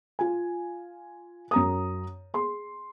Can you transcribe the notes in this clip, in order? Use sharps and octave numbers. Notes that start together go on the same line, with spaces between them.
F4 G#5
F#2 A#5 D#6
G#4 C6